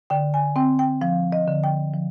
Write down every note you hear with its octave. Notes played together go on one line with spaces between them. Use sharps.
D3 G5
G#5
C4 G5
G5
F3 F5
D#5
D3
G5
F3